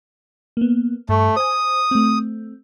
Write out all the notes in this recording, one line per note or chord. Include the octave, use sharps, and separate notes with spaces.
A#3 B3
G2 A3 C#6
C5 G#5 D#6
A3 C4